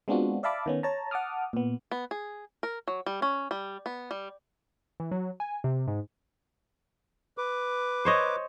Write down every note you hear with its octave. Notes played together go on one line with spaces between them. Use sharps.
G#3 B3 C4 D4 F4 F#4
D5 E5 F5 A5 B5 D6
D#3 B3 C#4
C#5 A5 A#5
F#5 A5 D6 D#6 F6
A#2 B3
B3
G#4
A#4
F#3
G3
C#4
G3
B3
G3
E3
F#3
G#5
C3
G#2
B4 D6
C5 C#5 D#5